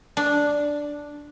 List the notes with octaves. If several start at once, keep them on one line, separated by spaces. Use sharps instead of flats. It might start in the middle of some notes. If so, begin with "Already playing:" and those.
D4